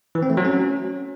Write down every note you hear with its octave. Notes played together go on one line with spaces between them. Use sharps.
E3
C4
A3
F#3
C#4